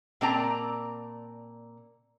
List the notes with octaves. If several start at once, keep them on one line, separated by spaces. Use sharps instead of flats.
A#2 A#3 C4 D5 A5 A#5